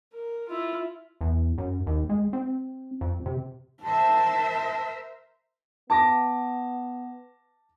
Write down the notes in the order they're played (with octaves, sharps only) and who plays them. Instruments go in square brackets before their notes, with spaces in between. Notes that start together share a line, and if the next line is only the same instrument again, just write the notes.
[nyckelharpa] A#4
E4 F4
[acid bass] E2
F#2
D#2
G#3
C4
F2
C3
[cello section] A#4 C5 E5 [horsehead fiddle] A5
[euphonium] B3 [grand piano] A5 D6 A#6